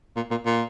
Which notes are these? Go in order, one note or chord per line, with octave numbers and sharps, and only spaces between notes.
A#2
A#2
A#2